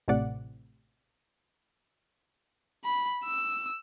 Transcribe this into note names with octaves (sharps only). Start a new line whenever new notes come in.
A1 A2 C3 D5 F#5
B5
E6